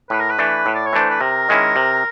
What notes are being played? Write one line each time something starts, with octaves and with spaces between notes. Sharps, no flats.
A2 B4
A#4
B4
E3 A3 D4
A2
D5
C#5
E3 A3 D4 C5
B4
C3 A#4
D#3 G#3 C#4 E4
C3